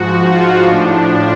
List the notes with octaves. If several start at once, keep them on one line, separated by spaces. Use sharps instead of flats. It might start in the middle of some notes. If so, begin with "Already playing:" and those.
Already playing: G#2 F3 F#4
F4
A2 F3 D4
D4